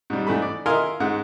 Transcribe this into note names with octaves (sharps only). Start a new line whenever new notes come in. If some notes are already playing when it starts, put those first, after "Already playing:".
G#2 G3
G#2 E3 A3 B5
D5
E4 A#4 D#5 F5 G#5 C6
G#2 G#3 F#5